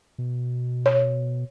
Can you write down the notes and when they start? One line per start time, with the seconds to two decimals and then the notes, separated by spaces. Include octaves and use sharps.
0.19 B2
0.86 C#5